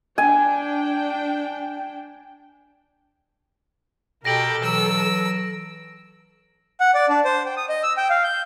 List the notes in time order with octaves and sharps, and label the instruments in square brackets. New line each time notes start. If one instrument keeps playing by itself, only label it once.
[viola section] D4 G5 [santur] G#5
[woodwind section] B2 [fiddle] G4 [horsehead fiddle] A4 A#4 [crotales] A#6 D7 F#7
[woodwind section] E3 F#3 [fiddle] E6
[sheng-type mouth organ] F#5
D5
D4
C5
G5
D#6
D#5
E6
G5
F5
G6